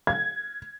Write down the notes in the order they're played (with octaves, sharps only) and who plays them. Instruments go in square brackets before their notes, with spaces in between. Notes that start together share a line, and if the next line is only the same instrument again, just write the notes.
[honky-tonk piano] G#6